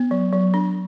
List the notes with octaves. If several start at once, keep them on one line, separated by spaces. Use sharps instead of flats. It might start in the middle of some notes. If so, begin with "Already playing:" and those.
Already playing: B3
F#3
F#3
D4